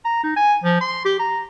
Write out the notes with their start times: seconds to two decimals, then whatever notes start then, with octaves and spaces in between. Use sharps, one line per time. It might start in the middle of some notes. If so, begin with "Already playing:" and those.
0.05 A#5
0.24 D#4
0.36 G#5
0.64 F3
0.81 C6
1.05 G4
1.19 A#5